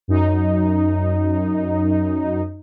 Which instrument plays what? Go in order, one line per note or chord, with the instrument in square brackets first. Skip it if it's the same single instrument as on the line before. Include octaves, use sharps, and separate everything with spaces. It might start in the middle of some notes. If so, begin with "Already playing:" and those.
[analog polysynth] F#2 D#4